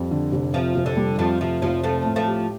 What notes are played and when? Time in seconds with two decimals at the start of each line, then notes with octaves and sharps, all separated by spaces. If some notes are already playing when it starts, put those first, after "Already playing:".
Already playing: F2 G3
0.11 D3
0.32 F1
0.54 C3 F3
0.75 F1
0.86 D3
0.97 G3
1.18 F2 F3 A3
1.41 C3 F3
1.62 F1 F3
1.83 F3 A3 C4
2.05 A2
2.16 F3 A3
2.27 G4